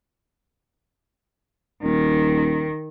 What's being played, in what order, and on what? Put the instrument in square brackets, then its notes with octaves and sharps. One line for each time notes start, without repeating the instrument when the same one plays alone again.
[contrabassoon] D#1 [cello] D#3